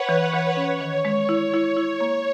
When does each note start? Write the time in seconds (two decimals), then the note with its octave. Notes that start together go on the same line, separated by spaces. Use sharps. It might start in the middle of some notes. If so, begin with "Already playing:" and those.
Already playing: B4 C#5 F#5
0.09 E3
0.34 E3
0.57 C#4 C#5
0.81 D#3
1.05 G#3
1.29 E4
1.54 E4
1.77 E4
2.01 A#3